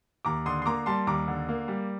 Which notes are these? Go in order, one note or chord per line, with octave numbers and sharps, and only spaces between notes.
D#2 A#5 D6
D3 C6 D#6
C6
A#3 A#5 D6
G3 A5 C6
D#2 A#5 D6
D3
A#3
G3